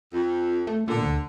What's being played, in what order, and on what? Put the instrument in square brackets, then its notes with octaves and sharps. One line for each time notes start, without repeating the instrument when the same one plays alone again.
[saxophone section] F2
[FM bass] A3
[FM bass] A#2 [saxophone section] D3
[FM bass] D2